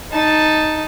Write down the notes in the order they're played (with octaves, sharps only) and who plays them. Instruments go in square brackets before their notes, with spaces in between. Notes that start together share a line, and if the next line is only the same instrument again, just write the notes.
[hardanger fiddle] D#4 A5